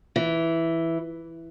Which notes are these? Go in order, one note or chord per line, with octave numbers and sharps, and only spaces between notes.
E3